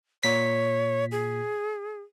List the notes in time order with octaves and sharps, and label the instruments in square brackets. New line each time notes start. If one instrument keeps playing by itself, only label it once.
[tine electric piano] A#2 B6 [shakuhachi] C#5
[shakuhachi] G#4